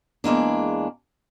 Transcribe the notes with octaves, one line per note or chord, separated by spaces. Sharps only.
E2 G#3 A#3 D4